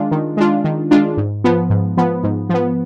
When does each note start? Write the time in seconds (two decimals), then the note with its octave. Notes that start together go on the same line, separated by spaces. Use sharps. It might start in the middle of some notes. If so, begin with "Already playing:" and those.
Already playing: D#3 G#3 D4 F4
0.11 D#3
0.37 G#3 D4 F4
0.64 D#3
0.91 G#3 D4 F4
1.17 G#2
1.44 F3 B3
1.70 G#2
1.97 F3 B3
2.24 G#2
2.49 F3 B3